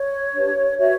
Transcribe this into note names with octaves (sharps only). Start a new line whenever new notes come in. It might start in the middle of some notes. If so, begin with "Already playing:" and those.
Already playing: C#5
D4 G4 B4
F#4 B4 C#5 E5